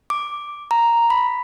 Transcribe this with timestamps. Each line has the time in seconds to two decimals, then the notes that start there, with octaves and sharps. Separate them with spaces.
0.10 D6
0.71 A#5
1.10 B5